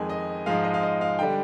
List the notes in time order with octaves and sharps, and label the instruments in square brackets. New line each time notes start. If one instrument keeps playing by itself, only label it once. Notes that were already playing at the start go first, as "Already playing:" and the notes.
Already playing: [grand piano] F2 D#3 G#3 G#5
D#5
G#2 F3 G#3 F5
D#5
F5
D#5
F5
D3 G3 G5